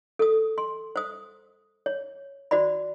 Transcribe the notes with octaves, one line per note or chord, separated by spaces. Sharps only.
A4 D#6
C6
C5 D#6
C#5
F#4 C5 D5 B5